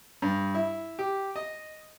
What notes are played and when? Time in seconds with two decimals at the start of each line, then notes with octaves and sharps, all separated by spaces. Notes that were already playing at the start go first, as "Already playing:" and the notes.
0.22 G2
0.54 E4
0.99 G4
1.36 D#5